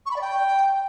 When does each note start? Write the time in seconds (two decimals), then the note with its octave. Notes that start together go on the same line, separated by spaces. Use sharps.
0.06 C#6
0.11 B5
0.16 D5
0.21 G5